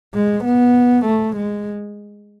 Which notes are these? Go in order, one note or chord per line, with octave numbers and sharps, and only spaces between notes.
G#3
B3
A3
G#3